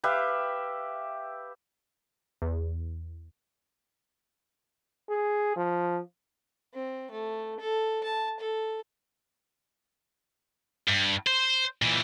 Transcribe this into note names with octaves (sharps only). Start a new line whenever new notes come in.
G4 B4 E5 F5
E2
G#4
F3
C4
A3
A4
A5
A4
G2
C5
A#2 E3